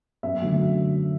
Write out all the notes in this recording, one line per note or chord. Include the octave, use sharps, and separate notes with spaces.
F#2 E5
D3 F#3 A3